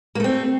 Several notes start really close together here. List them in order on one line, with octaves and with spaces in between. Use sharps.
A#3 A3 C4